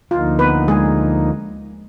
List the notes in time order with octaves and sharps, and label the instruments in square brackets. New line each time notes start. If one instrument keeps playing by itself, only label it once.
[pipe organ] D2 D3 F3 A#3 D#4 [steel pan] F4
[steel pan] B3 B4
G#3 G#4